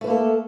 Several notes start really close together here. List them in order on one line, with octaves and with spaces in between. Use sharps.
A3 B4 A#3 A4